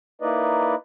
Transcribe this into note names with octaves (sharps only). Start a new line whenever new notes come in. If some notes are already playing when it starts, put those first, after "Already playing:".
A#3 D#4 E4 B4 D5 D#5